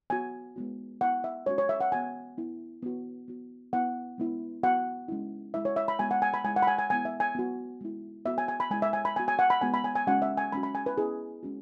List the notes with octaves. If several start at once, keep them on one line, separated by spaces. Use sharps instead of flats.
B3 F#4 G#5
G#3 B3 F#4
B3 E4 F#5
E5
G#3 C#4 F#4 C#5
C#5
E5
F#5
B3 F#4 G#5
B3 E4
B3 F#4
B3 F#4
B3 E4 F#5
G#3 B3 E4
B3 F#4 F#5
G#3 C#4 E4
G#3 E4 E5
C#5
E5
B5
G#3 B3 F#4 G#5
F#5
G#5
B5
G#3 E4 G#5
F#5
B5
G#5
G#5
G#3 B3 E4 G#5
E5
G#5
B3 F#4
G#3 E4
B3 F#4 E5
G#5
G#5
B5
G#3 E4 G#5
E5
G#5
B5
B3 F#4 G#5
G#5
F#5
B5
G#3 B3 F#4 G#5
B5
G#5
G#5
G#3 C#4 F#4 F#5
E5
G#5
G#3 C#4 F#4 B5
B5
G#5
B4
B3 E4 G#4
G#3 C#4 F#4